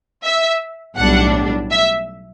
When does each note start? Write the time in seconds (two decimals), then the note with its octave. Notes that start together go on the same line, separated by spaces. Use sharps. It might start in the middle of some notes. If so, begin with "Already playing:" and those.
0.23 E5
0.97 B1 A2 G3 D4 F#5
1.71 E5